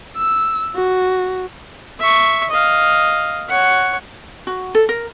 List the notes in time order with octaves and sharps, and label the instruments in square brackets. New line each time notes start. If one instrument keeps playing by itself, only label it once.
[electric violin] E6
F#4
[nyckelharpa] E5 C#6
D#5 F5
C#5 F#5
[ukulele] F#4
A4
A#4